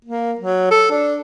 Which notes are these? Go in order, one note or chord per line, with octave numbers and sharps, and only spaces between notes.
A#3
F#3
A4
D4